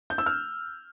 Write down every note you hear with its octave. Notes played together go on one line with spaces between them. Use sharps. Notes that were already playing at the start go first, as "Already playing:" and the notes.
G6
E6
F6